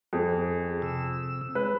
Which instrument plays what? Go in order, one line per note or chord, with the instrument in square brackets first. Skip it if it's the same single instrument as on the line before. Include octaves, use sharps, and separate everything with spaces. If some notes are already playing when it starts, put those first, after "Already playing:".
[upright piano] F2 [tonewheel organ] G#4
[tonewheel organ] C3 E6
[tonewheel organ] G#3 [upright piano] B4